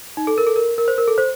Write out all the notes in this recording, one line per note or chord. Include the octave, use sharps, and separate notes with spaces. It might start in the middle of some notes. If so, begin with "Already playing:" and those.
D#4
A4
A#4
A4
A#4
A#4
C5
A#4
A4
C5